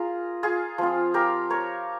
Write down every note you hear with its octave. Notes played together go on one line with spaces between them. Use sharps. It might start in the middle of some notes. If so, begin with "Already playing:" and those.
Already playing: F4 G#4 A#4
F4 G#4
F3 C4 F4
G4 A#4
A#4 C#5